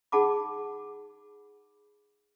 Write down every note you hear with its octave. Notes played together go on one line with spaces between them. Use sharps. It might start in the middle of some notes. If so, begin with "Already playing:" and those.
D#4 G#4 F#5 A5 B5 D6